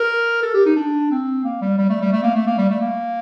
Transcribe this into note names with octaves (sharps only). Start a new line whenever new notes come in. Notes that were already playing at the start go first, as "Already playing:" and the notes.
Already playing: A#4
A4
G4
D#4
D4
C4
A#3
G3
G3
A3
G3
A3
A#3
A3
A#3
G3
A3
A#3